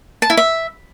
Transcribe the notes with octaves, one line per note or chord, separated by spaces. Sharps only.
A5
E4
E5